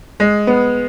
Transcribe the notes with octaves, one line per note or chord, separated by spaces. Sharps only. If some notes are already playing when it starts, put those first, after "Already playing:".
G#3
B3